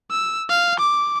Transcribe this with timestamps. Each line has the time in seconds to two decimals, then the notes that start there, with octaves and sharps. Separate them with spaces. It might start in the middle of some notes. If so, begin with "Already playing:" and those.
0.11 E6
0.50 F5
0.79 D6